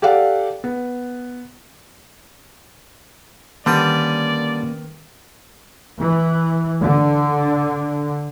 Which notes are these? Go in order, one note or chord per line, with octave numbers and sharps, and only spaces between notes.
G4 A4 D5 F5 F#5
B3
D3 D#3 G3 A#3 C#4 B4 D5 D#6
E3
D3